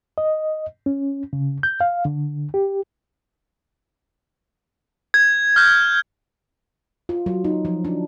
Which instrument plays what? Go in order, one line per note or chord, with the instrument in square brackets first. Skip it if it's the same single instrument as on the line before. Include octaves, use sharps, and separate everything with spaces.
[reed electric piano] D#5
C#4
C#3
G6
F5
D3
G4
[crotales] G#6
F6 G6
[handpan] F4
F#3
D#4
F3
D4